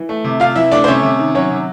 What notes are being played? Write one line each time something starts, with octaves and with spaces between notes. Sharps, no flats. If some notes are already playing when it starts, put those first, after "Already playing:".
Already playing: E3
A3
C3
C3 F4 F5
E3 E4 E5
A3 D4 D5
C5
C3 C#4 C#5
C3
D#3
F#3 C#4 C#5
C3